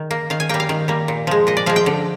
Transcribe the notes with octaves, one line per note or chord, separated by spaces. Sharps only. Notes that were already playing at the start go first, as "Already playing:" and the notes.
Already playing: D#3
A#3
D#3 F5
G#5
G3 A#3 G5
F5
D#3
G3 A#3
A#2
F3 G#3
A#2 D#5
D5
F3 G#3 F5
G5
D3